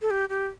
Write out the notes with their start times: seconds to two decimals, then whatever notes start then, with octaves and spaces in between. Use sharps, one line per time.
0.02 A4
0.10 G4
0.29 G4